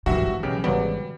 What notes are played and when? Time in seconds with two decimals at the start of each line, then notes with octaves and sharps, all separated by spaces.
0.06 G#1 G2 C3 E3 F#4 E5
0.43 B1 C#3 G4
0.64 G#1 C#3 F#3 G3 B3 D5